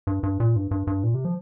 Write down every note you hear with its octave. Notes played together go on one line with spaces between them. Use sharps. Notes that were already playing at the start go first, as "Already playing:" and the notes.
G2
G2
A#2
G2
G2
G2
A#2
C3
F3